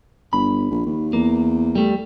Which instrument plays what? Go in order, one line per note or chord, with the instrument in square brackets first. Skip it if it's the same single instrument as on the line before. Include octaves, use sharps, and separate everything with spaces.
[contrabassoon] G1 [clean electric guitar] B5
[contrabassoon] A#1
D#2
[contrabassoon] E2 [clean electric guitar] A#3
[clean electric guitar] G3 A3